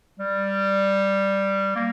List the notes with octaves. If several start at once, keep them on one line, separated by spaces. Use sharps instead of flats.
G3
A#3